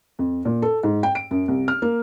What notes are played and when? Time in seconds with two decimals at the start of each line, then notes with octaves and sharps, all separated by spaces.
0.19 F2
0.45 A#2
0.62 A4
0.83 G#2
1.03 G5
1.15 D7
1.31 F#2
1.48 C2
1.68 F6
1.82 A#3